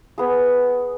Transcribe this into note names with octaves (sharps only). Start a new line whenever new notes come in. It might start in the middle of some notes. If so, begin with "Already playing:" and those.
B3 G#4